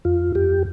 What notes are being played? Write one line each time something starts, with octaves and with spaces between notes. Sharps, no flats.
F2 F4
F2 G4